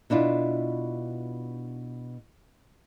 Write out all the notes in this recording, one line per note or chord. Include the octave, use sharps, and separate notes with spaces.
B2 D4 E4 F4